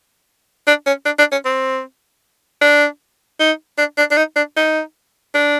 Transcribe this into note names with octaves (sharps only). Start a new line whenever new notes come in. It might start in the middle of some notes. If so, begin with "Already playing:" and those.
D4
C#4
D4
D4
C#4
C4
D4
D#4
D4
D4
D4
D#4
D4
D#4
D4